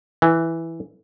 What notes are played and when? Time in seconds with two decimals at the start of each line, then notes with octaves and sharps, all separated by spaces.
0.22 E3